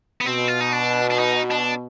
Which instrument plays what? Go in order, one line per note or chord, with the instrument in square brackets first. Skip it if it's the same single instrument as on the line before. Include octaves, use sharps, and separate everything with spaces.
[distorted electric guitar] B3
[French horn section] B2 [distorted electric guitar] C4
[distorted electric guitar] F4
D#4
D4
D4
D#4
D4